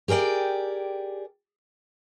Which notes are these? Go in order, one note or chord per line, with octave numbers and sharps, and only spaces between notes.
G4 G#4 A#4 D5 G5